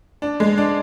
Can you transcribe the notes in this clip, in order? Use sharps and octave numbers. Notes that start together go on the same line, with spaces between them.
D4
G#3
D4